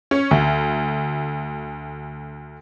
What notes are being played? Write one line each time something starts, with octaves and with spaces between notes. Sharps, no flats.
C#4
D2